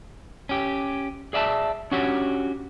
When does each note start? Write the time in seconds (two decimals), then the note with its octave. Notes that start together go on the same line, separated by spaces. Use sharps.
0.49 C#4 G4
1.33 G#4 D5 E5 G#5 A5
1.91 C#4 D4 F#4 G4 C#5